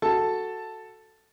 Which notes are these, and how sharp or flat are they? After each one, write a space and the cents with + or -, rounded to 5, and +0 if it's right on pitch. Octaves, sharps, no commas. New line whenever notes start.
F#4 +0 A4 +0 A5 +0